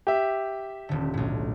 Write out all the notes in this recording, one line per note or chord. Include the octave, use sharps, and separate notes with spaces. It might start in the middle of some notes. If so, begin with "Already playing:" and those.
G4 E5
D#1 D3
B1 A2